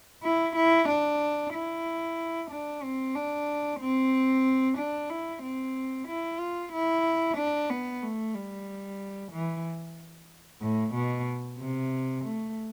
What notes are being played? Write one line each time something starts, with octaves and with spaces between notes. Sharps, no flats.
E4
E4
D4
E4
D4
C4
D4
C4
D4
E4
C4
E4
F4
E4
D4
B3
A3
G3
E3
A2
B2
C3
A3